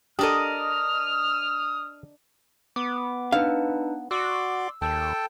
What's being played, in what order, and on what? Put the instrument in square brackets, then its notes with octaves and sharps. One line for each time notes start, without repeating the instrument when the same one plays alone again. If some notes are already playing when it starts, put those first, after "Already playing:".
[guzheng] D4 A#4 D#5 [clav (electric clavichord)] G4 A4 [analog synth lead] D#6 [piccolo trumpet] F6
[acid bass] B3 [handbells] D6
[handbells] D4 D#4 B4 [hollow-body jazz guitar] F5
[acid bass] F#4 [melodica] D5 C6 D6 [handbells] E6
[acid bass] D#2 [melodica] A4 G5 A5